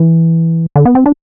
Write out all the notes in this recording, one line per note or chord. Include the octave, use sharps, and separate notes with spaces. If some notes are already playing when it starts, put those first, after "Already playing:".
Already playing: E3
D3
B3
C4
D4